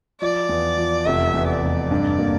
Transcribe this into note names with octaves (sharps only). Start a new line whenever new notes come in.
F3 D5
E2
F3
F1 E5
E2
D5
F1
G2
A#3